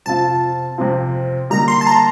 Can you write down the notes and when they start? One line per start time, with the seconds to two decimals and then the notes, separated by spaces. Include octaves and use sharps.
0.06 F2 C3 F3 C4 F4 A5
0.78 F2 C3 F3 C4 F4
1.50 D3 G3 A#3 D#4 A#5
1.68 C6
1.81 A5
1.87 A#5